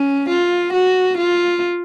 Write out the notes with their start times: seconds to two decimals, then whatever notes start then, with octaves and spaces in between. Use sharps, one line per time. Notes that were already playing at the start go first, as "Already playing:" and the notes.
Already playing: C#4
0.29 F4
0.72 F#4
1.17 F4